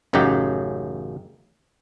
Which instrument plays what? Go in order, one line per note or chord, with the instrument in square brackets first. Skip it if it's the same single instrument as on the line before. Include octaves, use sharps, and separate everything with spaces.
[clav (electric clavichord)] A1 F#2 C#3 D#4 G4 F#5